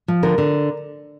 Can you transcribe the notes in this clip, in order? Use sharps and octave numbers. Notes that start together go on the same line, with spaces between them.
F3
D3 A#4
D3